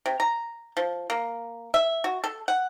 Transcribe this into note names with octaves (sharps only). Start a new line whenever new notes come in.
C3
A#5
F3
A#3
E5
F#4
A4
F#5